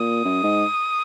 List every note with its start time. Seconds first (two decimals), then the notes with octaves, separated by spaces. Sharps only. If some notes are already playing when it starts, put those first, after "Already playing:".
Already playing: A#2 D#6
0.24 F#2
0.43 G#2